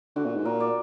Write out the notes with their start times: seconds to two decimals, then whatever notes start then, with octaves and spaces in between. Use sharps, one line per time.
0.16 D3 F#4
0.25 A#2
0.36 G#2
0.45 A#2 A#4
0.60 D5